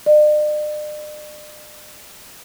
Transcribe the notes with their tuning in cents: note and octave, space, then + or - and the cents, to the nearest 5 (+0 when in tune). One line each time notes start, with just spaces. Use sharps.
D5 +45